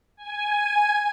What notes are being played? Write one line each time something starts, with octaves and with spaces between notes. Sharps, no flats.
G#5